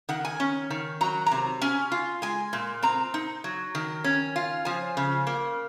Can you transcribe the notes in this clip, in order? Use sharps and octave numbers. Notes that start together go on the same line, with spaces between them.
D#3 F#5
G#5
C#4
D#3
F#3 A#5
A#5
C3
C#4 G#5
F4
G#3 G#5
A#2
C4 A#5
D#4
F#3
D#3
C#4
F4
F3 G#5
C#3
A#3